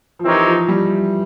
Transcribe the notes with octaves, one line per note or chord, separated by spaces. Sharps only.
F3
E3 C4 D#4 G4 A#4 C#5
F3
G3